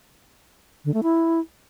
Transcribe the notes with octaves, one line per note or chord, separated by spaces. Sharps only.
D3
A3
E4